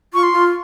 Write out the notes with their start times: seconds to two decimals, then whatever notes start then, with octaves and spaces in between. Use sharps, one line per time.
0.14 F4 C#6
0.23 C6
0.33 F4